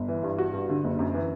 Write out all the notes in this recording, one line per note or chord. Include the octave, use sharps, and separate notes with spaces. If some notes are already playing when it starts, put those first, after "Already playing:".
Already playing: G1
E3
G2
F#4
G2
D3
F#1
F#2
E3